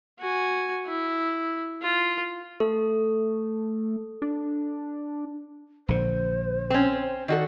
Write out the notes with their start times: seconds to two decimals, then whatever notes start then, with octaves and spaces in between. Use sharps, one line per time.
0.19 F#4 G#5
0.86 E4
1.82 F4
2.60 A3 A4
4.22 D4
5.88 A#1 D3 C5
6.70 C4 C#4
7.28 D#3 F#4 A4 D5